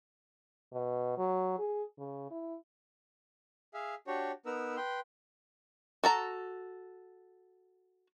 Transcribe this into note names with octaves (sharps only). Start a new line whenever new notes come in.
B2
F#3
G#4
C#3
E4
G#4 E5 F5
D4 F#4 G4 C#5
B3 D#4 A#4 B4 E6
B4 G5 C6
F#4 A4 A#5